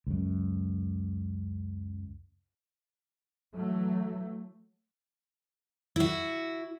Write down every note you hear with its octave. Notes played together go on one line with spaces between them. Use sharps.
C#2 F#2
E3 F#3 A3
E4 F#4